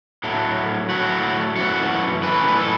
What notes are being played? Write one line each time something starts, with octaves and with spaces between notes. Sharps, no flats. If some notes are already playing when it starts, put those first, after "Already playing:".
A2 F#3 A3
A2 F#3 A3 F#4
F#2 E3 A3 F#4
F#2 E3 A3 B4
B4
A4